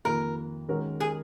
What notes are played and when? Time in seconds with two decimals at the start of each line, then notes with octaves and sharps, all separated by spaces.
0.05 F2 D#3 A#3 A#4
0.68 D#3 G#3 C#4 F#4 A#4
1.00 G#4